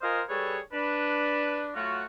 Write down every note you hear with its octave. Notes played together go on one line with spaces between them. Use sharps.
F4 A#4 C5 D#5 F5 G#5
G3 G#4 A4 B4 C#5
D4 B4
F#3 A3 F4 F#4